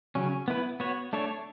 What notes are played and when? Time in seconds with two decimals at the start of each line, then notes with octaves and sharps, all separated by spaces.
0.15 C#3 F#3 C#4
0.48 B3 E4 B4
0.80 B3 F#4 C#5
1.13 A3 D4 A4 C#5